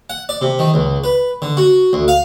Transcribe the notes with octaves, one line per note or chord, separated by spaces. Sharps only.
F#5
D5
C3
D#3
C#2
B4
D3
F#4
D2
F5